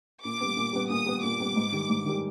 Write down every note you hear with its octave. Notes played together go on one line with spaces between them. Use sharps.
A#2 D6
G3 B3
A#2
G3 B3
A#2 D#6
G3 B3
A#2 D6
G3 B3
G#2
D#3 G3
G#2
D#3 G3